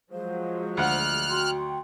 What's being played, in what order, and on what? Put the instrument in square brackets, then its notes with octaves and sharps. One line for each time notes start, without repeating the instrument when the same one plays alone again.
[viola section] F3 F#3 G#3 [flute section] C5 F5
[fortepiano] D2 F#5 [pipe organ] F6 F#6
[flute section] F#4 G5 C6